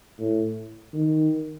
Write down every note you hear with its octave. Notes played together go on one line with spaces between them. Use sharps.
A2
D#3